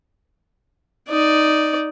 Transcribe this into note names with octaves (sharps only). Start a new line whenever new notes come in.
D#4 D5